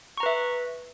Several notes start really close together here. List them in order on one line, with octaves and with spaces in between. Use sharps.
C#6 A#5 B4 E5